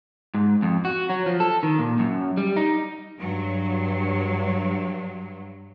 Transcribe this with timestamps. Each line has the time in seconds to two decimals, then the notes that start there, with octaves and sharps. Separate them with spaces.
0.34 G#2
0.62 F2
0.85 F#4
1.10 F#3
1.26 F3
1.40 A4
1.63 D#3
1.79 A#2
1.99 F#2
2.37 G3
2.57 D#4
3.19 G2 F#3